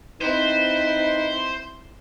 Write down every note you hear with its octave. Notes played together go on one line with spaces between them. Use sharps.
C4 D#4 E4 B4 C5